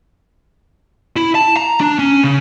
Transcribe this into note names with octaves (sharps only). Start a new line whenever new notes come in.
E4
A5
A#5
D4
C#4
C#3